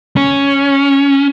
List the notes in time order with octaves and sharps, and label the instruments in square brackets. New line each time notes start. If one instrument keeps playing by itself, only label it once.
[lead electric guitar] C#4